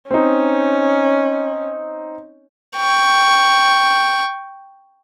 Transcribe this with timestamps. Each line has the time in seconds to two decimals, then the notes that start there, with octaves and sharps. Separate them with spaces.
0.11 C4 C#4 D#4
2.77 G5 C#6